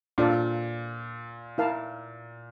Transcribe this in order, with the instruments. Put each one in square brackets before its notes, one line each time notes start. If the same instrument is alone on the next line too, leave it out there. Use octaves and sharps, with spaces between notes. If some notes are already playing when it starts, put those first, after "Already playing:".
[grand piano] A#2 [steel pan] D4 F4 A4 D5
[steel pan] E4 A#4 F5 A5